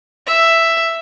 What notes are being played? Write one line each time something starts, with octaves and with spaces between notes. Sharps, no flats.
E5